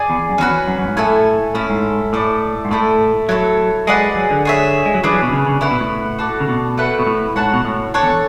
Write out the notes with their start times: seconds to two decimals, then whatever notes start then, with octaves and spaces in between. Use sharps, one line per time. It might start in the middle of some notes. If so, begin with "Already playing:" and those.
Already playing: G#4 D5 G#5
0.10 E2
0.30 F#2
0.38 E2 C#4 F#4 B4
0.67 F#2
0.79 F#2
0.88 G#2
0.97 A2 E4 A4 E5 G#5
1.55 A2 C#4 E4 A4
1.70 G#2
2.13 A2 A3 E4 A4 D5
2.65 G#2
2.71 A2 A3 E4 A4
3.29 F#3 E4 A4 C#5
3.87 G#3 G#4 B4 D5 F#5
4.16 F#3
4.31 D3
4.45 G#4 C#5 E5
4.86 G#3
4.94 F#3
5.04 E3 D4 G#4 B4
5.13 F#3
5.22 B2
5.32 C#3
5.47 C#3
5.61 C#3 E4 B4 F#5
5.71 B2
5.80 A2
6.19 F#4 A4 D5 A5
6.40 C#3
6.48 B2
6.78 A3 E4 B4 F#5
6.99 B2
7.07 A2
7.36 G#2 F#4 C#5 F#5 A5
7.53 B2
7.65 A2
7.94 D4 A4 C#5 F#5
8.03 E2